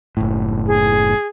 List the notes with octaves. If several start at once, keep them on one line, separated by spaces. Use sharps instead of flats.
F#1 A2
G#4